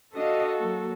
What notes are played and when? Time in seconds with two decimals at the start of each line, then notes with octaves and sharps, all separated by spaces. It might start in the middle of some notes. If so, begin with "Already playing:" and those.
0.15 D4 F#4 A4 D#5 F5
0.58 F#3 A#3